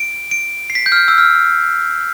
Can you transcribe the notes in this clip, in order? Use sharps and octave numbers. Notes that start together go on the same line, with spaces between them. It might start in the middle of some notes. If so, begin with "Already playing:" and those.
Already playing: D7
D7
C7
B6
G6
F6
G6
E6
F6